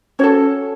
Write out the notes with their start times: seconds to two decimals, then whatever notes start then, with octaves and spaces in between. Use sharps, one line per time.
0.19 C#4 F#4 A4 C#5